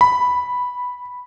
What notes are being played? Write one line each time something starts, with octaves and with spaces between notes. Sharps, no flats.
B5